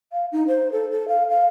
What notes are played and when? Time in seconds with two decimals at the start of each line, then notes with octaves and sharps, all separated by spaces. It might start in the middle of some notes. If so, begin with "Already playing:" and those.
0.12 F5
0.32 D#4
0.47 C5
0.72 A4
0.91 A4
1.08 F5
1.29 F5